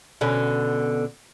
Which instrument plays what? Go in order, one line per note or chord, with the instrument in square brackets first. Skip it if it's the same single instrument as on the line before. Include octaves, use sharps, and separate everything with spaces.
[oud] B2 D3 C#4